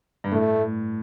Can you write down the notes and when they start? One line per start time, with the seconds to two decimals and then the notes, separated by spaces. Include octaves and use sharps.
0.24 G2
0.32 A2 A3